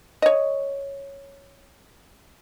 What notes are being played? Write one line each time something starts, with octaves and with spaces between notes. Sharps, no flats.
C#5 D#5